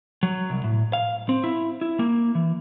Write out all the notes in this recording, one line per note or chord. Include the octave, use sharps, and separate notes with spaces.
F#3
C2
A2
F5
C4
E4
E4
A#3
E3